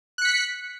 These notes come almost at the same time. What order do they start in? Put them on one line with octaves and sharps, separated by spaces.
F#6 C#7 B6